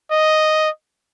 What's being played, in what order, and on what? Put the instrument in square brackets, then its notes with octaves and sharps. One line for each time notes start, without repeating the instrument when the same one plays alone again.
[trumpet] D#5